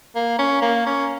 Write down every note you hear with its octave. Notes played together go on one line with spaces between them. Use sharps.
A#3
C#4
A#3
C#4